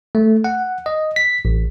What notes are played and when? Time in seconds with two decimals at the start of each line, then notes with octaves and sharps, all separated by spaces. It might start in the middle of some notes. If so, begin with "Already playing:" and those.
0.15 A3
0.44 F#5
0.86 D#5
1.16 B6
1.45 A1